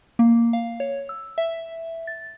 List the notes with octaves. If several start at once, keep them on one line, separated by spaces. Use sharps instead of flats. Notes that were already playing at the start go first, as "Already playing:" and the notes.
A#3
F5
C#5
E6
E5
A6